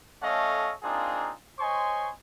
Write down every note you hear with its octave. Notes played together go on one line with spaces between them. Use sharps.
A3 C#4 A4 C#5 D#5 F5
A#3 C4 D4 D#4 F4 G#4
C5 C#5 D#5 G#5 C6 C#6